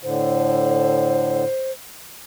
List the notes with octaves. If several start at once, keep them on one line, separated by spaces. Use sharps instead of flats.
A2 D3 C5